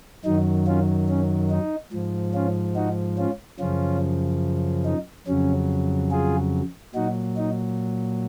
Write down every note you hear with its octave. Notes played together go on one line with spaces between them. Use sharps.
F#2 D#3 F#3 D#4
C#4 F4
C#4
D#4
G#2 F3
C#4 F4
D#4 F#4
C#4 F4
F#2 C#3 F3 C#4 F4
D#4
F2 C#3 F#3 C#4
F4 G#4
A#2 F#3 D#4 F#4
D#4